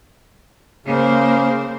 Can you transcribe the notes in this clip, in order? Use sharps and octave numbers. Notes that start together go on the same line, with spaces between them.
C#3 A#3 C5